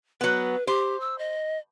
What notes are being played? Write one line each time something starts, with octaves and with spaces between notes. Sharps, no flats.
F#3 B3 B4
G4 C5
E6
D#5